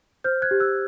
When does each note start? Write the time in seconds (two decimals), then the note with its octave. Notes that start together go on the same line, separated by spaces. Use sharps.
0.24 C5 F6 G6
0.42 F#6 G#6
0.51 G4
0.60 E6 F#6